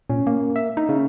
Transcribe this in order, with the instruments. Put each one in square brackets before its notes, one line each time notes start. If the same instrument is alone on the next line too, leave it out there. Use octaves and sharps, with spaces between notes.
[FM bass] A#2 [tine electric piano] C#4
[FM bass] A#3
[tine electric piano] E5
[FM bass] D#4
[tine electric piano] C#3